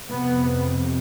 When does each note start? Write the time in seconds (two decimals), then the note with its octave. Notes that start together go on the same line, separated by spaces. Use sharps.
0.11 F2 C3 B3